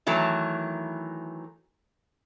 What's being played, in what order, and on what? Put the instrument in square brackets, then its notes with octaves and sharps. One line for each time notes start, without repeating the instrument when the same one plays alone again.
[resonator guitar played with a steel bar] D#3 E3 F#3 A3